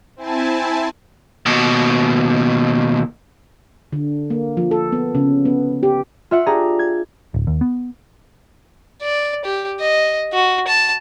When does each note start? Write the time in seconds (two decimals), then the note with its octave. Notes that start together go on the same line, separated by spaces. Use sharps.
0.16 C4 E4 G#5 A5
1.46 D#2 B2
3.92 D3
4.30 A#3
4.57 F3
4.71 A4
4.92 B3
5.15 C#3
5.45 B3
5.83 G4
6.31 F4 E5 F#5
6.46 D4 G4 G#4 A#5
6.79 G#6
7.34 D1
7.47 D#2
7.61 B3
9.02 D5
9.45 G4
9.80 D#5
10.33 F#4
10.67 A5